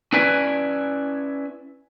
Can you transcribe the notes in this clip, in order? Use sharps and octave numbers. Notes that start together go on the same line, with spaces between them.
C#4 E4 B4 D5 G#5